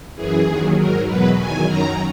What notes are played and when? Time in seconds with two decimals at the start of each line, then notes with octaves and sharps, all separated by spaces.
0.15 F#2 E3 G#4
0.46 D#2 D#3 F#3
0.76 G#2 F#3 A#4
1.07 E2 B2 F#3 B4
1.38 E2 D#3 F#3 G#5
1.67 F#2 D#3 F#3 A#5